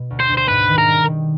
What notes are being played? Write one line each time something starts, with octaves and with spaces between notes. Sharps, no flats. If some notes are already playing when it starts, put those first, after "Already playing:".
Already playing: B2
D2
C5
D2
C5
G#2 B4
D#3
A#4
G3
D#3